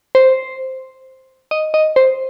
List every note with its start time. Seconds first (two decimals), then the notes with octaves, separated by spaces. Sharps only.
0.15 C5
1.51 D#5
1.74 D#5
1.96 C5